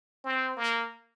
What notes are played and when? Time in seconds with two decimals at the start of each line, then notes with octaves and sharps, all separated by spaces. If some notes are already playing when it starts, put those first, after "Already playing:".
0.24 C4
0.57 A#3